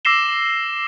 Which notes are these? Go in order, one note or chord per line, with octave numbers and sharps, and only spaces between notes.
D6 E6 A#6 C7 E7 G7